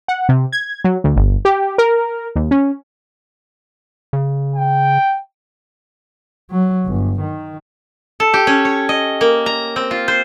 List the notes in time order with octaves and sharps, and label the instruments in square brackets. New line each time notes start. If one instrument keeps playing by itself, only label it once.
[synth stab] F#5
C3
G#6
F#3
D2
G1
G4
A#4
D#2
C#4
[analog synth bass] C#3
[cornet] G5
[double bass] F#3
G1
D#3
[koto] A4
G4
C#4
C#5
D#5
A#3
A#5
C4
F4
C5